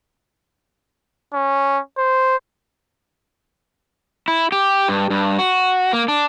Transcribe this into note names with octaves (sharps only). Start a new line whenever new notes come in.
C#4
C5
E4
G4
G2
G2
F#4
A#3
D4